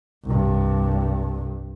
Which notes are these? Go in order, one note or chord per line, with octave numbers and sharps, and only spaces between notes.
C2 G2